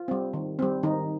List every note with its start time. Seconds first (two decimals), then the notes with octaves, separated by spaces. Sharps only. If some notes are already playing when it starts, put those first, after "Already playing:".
Already playing: F4
0.08 G3 C4
0.33 D#3
0.59 G3 C4
0.83 D#3 D#4